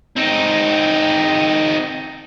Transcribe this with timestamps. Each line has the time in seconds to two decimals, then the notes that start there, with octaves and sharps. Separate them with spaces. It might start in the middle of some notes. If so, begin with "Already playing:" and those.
0.16 C4 D#4